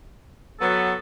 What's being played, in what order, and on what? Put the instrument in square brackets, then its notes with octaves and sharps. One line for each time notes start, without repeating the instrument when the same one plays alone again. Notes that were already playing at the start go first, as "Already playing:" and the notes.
[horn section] F#3 B3 [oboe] A4